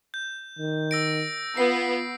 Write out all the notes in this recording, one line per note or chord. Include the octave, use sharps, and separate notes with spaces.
G6
D#3
E6 A#6 D7
B3 F4 C7